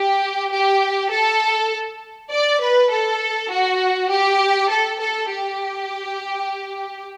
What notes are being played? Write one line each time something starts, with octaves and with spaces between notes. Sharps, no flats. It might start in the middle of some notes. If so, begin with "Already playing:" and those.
Already playing: G4
G4
A4
D5
B4
A4
F#4
G4
A4
A4
G4